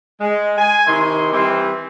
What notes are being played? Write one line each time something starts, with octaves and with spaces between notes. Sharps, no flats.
G#3
G#5
C3 D#3 E4 C6
E3 G3 C4